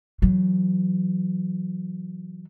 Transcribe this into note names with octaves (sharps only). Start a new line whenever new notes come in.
E3 F#3